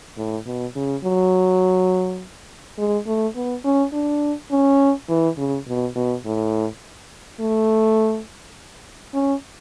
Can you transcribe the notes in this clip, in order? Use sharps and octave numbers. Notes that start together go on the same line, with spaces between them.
A2
B2
C#3
F#3
G#3
A3
B3
C#4
D4
C#4
E3
C#3
B2
B2
A2
A3
C#4